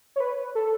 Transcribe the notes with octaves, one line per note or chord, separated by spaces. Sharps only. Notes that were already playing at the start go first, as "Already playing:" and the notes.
C#5
B4
A4